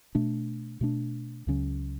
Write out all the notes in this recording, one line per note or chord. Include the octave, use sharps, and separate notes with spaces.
B2 A3 D4
B2 A3 D4
C#2 C#3 F#3 C#4